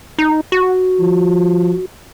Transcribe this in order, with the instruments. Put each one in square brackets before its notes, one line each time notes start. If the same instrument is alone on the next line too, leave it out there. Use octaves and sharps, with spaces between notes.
[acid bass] D#4
F#4
[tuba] F3